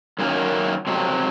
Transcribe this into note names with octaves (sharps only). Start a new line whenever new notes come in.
F#2 D#3 F#3 A#3 C#4
F2 C3 F#3